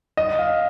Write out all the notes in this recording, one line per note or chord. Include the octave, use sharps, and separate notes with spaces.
D#5
F5